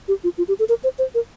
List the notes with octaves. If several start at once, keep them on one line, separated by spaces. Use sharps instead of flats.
G4
F4
F4
G4
A4
A#4
C5
C5
A#4